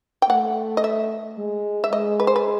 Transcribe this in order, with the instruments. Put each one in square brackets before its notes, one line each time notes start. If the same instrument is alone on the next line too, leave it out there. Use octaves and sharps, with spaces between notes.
[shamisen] G5
[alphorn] A3 [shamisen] F#5
[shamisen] D#5
E5
[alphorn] G#3
[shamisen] E5
[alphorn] G#3 [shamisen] D#5
[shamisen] B4
C5
B4